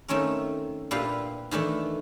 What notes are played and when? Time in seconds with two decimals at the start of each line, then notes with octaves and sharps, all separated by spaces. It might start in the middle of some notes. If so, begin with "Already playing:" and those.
0.08 D#3 A3 C4 C#4 A#4
0.91 A#2 D4 E4 G4 B4 F5
1.51 D#3 E3 A3 D4